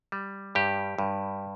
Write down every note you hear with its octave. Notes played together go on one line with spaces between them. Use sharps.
G3
G2 G4
G2